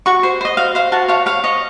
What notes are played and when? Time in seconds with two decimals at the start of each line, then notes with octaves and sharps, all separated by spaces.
0.06 F#4 C#6
0.23 C5
0.41 C5 D#5
0.57 F#4 F5
0.75 C5 F5
0.92 F#4 A5
1.08 C#5 F5
1.26 C#5 F5
1.44 C#5 D#5